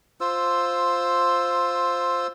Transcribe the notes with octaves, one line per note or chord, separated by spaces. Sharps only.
F4 C5 E6